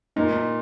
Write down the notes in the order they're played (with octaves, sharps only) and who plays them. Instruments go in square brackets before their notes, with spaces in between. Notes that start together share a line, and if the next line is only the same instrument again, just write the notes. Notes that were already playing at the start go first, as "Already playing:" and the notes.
[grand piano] A#2 [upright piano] D#4